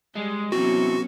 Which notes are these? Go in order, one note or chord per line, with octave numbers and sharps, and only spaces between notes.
G3 G#3
C3 E3 F#3 B3 C#4 F#4